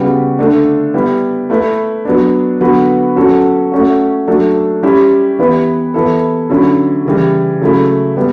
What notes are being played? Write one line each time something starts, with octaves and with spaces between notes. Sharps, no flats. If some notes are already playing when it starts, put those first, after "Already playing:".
Already playing: C#3 G3 B3 F#4
D3 A3 D4
G3 B3 E4
A3 E4 B4
F#3 B3 D4
D3 F#3 B3 F#4 B4
F#3 C#4 F#4 A4
A3 C#4 F#4
F#3 A3 D4 A4
G3 C#4 E4 G4
E3 B3 E4 G4 B4
E3 B3 E4 A4
D3 F#3 C#4 E4
C#3 E3 G3
C#3 F#3 A3 E4
G3 B3